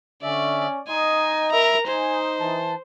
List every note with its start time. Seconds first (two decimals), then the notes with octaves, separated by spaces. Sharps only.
0.23 D3 C#4 D5 E5
0.88 D#4 D#5 G#5 C6
1.52 A#4 E5 A#5 B5
1.87 D#4 C5 G#5
2.40 E3 A5